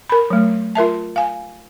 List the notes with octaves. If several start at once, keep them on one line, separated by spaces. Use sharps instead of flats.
A#4 B5
F#3 A3
F4 A#4 E5 A5
F5 G#5